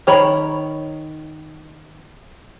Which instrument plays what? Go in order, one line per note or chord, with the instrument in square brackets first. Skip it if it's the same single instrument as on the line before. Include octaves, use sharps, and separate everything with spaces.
[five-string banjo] D#3 C#5 A#5 B5